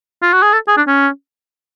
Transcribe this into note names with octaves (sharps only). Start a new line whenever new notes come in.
F4
F#4
G#4
A4
G#4
D4
C#4